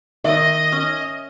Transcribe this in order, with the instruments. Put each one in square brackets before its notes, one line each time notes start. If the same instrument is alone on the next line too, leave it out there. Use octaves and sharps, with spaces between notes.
[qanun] D#3 [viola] D#5 [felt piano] E5
[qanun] C#4